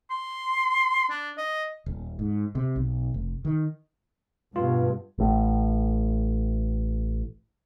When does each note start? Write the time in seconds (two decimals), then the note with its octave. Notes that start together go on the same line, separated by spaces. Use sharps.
0.10 C6
1.10 D4
1.37 D#5
1.86 D#1
2.19 G#2
2.55 C3
2.76 B1
3.14 F1
3.45 D#3
4.56 G2 B2 F4
5.18 A1 A2